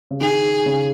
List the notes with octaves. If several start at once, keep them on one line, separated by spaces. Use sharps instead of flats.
C#3
D#3 G#4
C#3